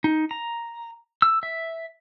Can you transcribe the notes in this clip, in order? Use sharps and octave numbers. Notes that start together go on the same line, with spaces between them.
D#4
A#5
E6
E5